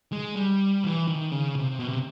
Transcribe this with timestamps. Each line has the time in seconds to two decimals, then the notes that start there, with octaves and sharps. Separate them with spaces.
0.12 G#3
0.36 G3
0.84 E3
1.07 D#3
1.32 C#3
1.55 C3
1.79 B2
1.89 C3